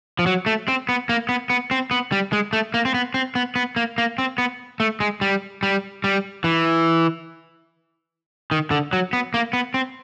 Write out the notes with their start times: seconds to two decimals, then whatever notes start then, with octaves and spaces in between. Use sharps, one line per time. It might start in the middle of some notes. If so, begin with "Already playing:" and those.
0.19 F3
0.26 F#3
0.46 A3
0.68 C4
0.89 B3
1.09 A#3
1.29 B3
1.50 B3
1.71 C4
1.91 B3
2.12 G3
2.33 G#3
2.53 A3
2.74 A#3
2.85 C4
2.94 B3
3.14 C4
3.35 B3
3.56 B3
3.76 A#3
3.98 A#3
4.18 C4
4.38 B3
4.80 A3
5.00 G#3
5.21 G3
5.63 G3
6.04 G3
6.44 E3
8.51 D#3
8.71 D3
8.93 F#3
9.13 B3
9.34 A#3
9.53 B3
9.74 C4